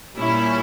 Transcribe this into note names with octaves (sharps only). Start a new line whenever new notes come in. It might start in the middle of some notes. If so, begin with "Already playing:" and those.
A#2 G3 C#4 E4